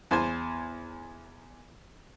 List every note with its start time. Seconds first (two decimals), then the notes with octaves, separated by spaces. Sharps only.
0.11 E2 C5 G#5